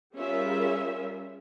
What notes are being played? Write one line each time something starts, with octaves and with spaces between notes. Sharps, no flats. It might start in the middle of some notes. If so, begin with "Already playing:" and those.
G3 C#4 F4 G#4 A#4 E5